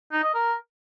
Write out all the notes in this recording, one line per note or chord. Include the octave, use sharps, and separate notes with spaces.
D#4
D#5
A#4